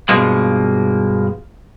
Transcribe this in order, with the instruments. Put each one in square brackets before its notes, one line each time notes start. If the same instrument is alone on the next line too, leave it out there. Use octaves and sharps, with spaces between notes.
[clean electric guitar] G2 B2 F3 G#3 A#3